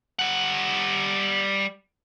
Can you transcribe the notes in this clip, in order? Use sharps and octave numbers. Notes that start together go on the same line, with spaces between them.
G3 F#5